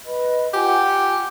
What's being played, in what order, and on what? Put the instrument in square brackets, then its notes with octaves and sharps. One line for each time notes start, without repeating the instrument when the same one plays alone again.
[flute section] B4 D#5 B5
[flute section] F4 F#5 G#5 [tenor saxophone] G4